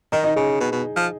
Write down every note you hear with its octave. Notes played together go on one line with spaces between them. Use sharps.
D#3 D#4 D#5
D#4 D#5
C#3 G#4
B2
B2
F3